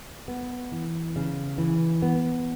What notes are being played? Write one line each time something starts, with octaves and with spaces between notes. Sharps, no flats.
B3
E3
C#3
E3
B3